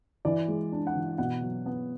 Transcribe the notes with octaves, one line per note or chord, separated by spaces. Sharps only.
E3 D5
G#3
D4
F#5
E3
B2 F#5
F#3
B3